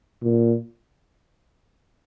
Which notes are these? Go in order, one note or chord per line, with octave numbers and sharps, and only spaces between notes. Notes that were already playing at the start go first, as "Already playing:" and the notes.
A#2